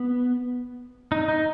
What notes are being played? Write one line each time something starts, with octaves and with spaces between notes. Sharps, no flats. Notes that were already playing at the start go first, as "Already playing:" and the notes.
Already playing: B3
D#4
D#4